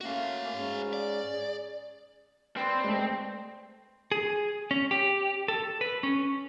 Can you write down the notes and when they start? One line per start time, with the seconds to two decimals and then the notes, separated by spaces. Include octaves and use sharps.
0.01 A3 A#3 C#4 F#4 F5
0.52 G#2 C#4
0.93 D5
1.34 G#4
2.57 C4 B4 D5 C6
2.84 G#3 A3
4.12 G#4
4.71 C#4
4.91 G4
5.48 A4
5.81 B4
6.03 C#4